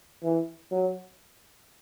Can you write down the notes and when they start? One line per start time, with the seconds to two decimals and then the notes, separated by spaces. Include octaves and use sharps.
0.23 E3
0.72 F#3